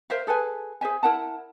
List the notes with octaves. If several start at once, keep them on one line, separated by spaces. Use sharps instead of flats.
A#4 C5 E5 F5
G#4 A4 B4 G#5
G#4 C5 E5 G#5
E4 A#4 F#5 A5